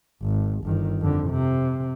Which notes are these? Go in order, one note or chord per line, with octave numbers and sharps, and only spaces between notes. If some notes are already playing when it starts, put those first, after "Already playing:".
G#1
G1 D#3
F2 D3
C3